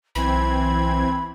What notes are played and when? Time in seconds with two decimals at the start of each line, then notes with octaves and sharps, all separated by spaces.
0.15 B1 E3 C4 B5 G#6